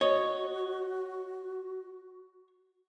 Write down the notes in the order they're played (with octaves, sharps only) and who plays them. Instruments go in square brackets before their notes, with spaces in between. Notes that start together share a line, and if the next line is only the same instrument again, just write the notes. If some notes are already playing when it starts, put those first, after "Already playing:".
[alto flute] F#4 [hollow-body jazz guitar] C#5 D#5